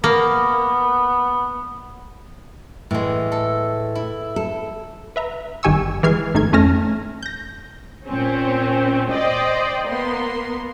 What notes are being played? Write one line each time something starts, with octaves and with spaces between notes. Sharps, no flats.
A#3 B3
A2 E3 G#3
A4
E4
A4
B4 E5 A#5
G1 D#3 G4 G#5 C#6 E6
E3 G#3 F6 G#6 C7
G#1 D#3 A3 D#4 G#6
F2 A3 C#4 A5 F6 A#6
G6 A#6
A#2 C4 C#4
C5 D5 D#5 G5
A#3 B3 C6